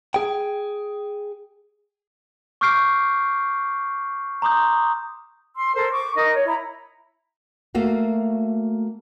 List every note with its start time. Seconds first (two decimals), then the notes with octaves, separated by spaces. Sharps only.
0.14 G#4 G5
2.61 C#6 D6 F6 G6 C7 D7
4.42 A#5 C6 D6 D#6 G6
5.56 C6 E6
5.74 A4 A#4 C5 E6
5.91 C#6 D6
6.15 D#4 A#4 D#5
6.32 C#5
6.45 E4 A#5 B5
7.75 A3 A#3 F#4 F5